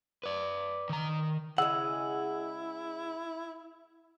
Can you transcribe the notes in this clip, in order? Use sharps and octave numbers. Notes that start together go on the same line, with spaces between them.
B4 D5
D#3 A#5
C#3 G#3 E4 F#5 E6